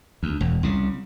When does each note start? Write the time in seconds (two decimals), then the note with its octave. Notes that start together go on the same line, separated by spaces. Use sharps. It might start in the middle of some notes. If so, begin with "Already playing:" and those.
0.23 D2
0.41 E1
0.63 C2 C#3